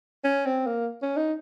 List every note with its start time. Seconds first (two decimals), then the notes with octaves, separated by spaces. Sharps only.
0.24 C#4
0.46 C4
0.67 A#3
1.02 C#4
1.17 D#4